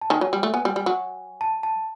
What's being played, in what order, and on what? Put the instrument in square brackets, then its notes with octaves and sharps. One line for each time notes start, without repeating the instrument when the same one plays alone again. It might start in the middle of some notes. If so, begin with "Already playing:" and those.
[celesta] A5
[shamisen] D#3 [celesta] G#5
[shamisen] F#3
G3
A3
[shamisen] B3 [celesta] G#5
[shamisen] G3
G3
F#3
[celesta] A5
A5